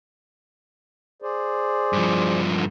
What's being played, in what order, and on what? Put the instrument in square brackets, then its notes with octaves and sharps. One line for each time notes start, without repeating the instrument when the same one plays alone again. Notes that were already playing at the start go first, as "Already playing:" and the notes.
[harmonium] G#4 C5 D5
[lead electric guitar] G2 F3
[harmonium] D3